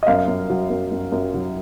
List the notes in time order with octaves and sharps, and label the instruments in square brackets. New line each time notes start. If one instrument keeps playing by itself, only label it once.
[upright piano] D#5
F#2 F5
F#2
F#3
F#2
F#2
F#2
F#3